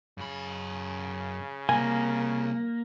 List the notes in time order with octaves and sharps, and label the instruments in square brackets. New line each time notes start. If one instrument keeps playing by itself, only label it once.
[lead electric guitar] F#2 B5 [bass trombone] C#3
[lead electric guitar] C3 G3 [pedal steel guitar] A#3 [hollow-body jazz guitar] G#5